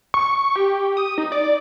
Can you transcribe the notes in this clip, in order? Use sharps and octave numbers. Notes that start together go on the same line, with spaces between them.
C#6
G4
D#6
D#4
D5